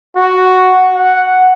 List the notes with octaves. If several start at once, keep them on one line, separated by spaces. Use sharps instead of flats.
F#4
F#5